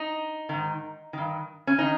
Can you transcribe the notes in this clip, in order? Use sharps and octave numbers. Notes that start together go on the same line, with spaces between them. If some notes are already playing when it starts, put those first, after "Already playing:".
Already playing: D#4
G#2 D#3
G2 D#3
C#4
D#3 D#4